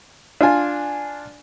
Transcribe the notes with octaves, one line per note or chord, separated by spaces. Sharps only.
D4 F4 G#5